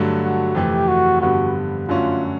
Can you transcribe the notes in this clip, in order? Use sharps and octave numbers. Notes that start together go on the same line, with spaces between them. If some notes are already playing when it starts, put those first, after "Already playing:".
Already playing: G2 D3 F#3 A3
F#4
F2 C3 E3 A3 G4
F#4
G2 D3 G3 B3 F#4
F#2 D3 F#3 A3 C#4 F4